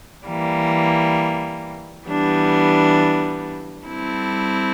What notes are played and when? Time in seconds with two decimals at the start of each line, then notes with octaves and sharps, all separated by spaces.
0.25 E3 G3 A#3
2.06 E3 G3 B3 D4
3.87 G3 C4 E4 A4